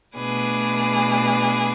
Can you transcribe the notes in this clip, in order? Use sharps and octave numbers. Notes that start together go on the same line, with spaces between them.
B2 A3 D4 G#4 B4